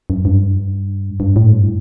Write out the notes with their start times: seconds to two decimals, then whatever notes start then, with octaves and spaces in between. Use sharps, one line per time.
0.10 F#2
0.25 G2
1.20 G2
1.36 A2
1.52 G2